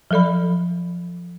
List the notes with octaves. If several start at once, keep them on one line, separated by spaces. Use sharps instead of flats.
F3 F#3 A4 D5 B5